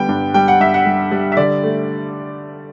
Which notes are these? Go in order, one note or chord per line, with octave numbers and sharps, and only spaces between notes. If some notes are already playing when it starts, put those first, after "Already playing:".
Already playing: D3 G3 B3 G5
G2
G3 G5
F#5
G2 E5
F#5
G3
G3
E5
D3 D5
A3